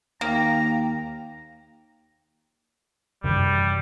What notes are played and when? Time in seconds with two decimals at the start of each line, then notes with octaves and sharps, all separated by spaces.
0.21 D#2 A#3 G5 A#5
3.24 F#2 C3 E3 G3